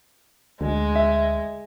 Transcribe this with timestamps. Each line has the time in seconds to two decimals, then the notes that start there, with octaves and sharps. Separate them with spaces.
0.61 D2 G#3
0.96 E5